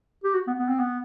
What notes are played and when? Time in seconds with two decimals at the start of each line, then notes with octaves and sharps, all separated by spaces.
0.24 G4
0.34 F#4
0.47 B3
0.59 B3
0.69 C4
0.79 B3